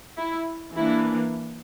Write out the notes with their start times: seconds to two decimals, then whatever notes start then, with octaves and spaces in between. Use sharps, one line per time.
0.17 E4
0.76 E3 A#3 D4 E4